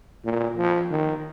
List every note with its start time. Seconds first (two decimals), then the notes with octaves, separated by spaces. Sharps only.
0.25 A#2
0.57 F3
0.91 D#3